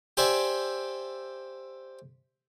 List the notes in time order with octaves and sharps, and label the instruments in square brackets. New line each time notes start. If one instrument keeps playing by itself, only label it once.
[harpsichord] G4 C5 D5 E5 G#5